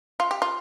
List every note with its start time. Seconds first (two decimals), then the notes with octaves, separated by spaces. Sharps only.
0.20 F4
0.31 G4
0.42 F4